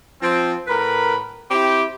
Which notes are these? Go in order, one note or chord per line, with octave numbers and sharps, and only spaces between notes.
F3 C4
A2 A#4 B4 B5
C4 E4 G4